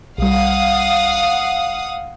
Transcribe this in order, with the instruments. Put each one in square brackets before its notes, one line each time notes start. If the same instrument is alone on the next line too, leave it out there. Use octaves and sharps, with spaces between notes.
[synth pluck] B1 G3 [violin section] F5 F#5 D#6